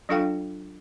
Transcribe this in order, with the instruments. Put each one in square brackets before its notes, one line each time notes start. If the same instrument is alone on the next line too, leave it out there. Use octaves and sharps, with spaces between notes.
[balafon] F#3 D4 F4 A4 F5 G5